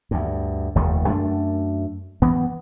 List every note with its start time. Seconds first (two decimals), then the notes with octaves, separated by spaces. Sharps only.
0.11 D2 G2
0.75 F1 D#2 D#3 A3
1.07 F#2 A3 D4
2.22 G2 E3 B3